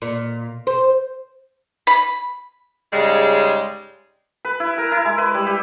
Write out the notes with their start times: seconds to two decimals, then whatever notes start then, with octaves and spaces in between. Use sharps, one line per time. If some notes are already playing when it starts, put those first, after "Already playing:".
0.02 A#2
0.67 C5
1.87 B5
2.93 G#2 C#3 G3 G#3
4.45 B4
4.60 E4
4.78 A#4
4.92 E4
5.05 G#3
5.18 B4
5.35 G3
5.46 G4